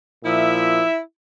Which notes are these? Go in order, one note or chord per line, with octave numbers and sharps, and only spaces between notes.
A#2 F3 E4 E5